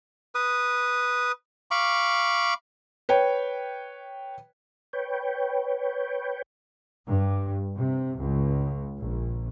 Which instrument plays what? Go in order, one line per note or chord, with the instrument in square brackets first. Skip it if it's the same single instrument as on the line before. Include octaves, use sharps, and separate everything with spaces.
[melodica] B4 D#6
F5 B5 C#6 D6
[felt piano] B4 C#5 G5
[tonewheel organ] B4 C#5 G5
[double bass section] G2
C3
C#2
A#1